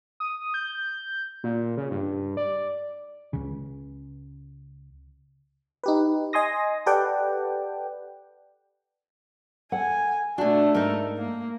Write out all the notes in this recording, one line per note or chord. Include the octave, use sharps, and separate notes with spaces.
D#6
G6
A#2
C#3
G2
D5
C#2 C#3
D#4 G4 B4
D#5 G#5 C6 D#6 A#6
G4 A4 B4 D5 F#5 G5
A4 F#5 G#5
B2 A3 D4 F#4
G#2 D#4 A4 A#4
A#3